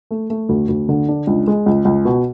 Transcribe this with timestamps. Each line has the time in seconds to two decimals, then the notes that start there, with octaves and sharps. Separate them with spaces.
0.11 A3
0.30 A3
0.49 D2
0.68 D2
0.89 D3
1.09 D4
1.27 C#2
1.47 G#3
1.66 C#2
1.85 C#2
2.05 B2